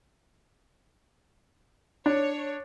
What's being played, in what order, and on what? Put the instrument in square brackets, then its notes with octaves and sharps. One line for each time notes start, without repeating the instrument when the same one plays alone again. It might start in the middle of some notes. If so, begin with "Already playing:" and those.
[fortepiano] D4 [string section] C#5